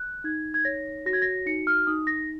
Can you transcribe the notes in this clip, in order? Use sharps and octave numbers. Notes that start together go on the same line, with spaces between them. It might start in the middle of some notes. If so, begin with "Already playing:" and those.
Already playing: F#6
D#4 G#6
G#6
C#5 A#6
F#4 A#6
G#6
A#6
D#4 C#7
F6
D#4 D#6
A#6